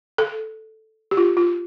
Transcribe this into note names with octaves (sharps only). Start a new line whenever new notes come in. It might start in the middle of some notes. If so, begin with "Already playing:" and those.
A4
G4
F4
F4